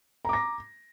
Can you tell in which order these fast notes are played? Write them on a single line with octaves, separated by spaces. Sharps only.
A#5 D6 A#6